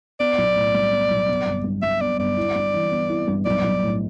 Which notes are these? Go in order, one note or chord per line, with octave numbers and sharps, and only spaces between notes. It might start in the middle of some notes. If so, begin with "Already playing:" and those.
B3 D5
B1
A2
G3
B3
B1
B3
G1
G2
G3 E5
B3 D5
G1 D5
E4
G2
E3
B3
E4
G2
B1 D5
B1
A2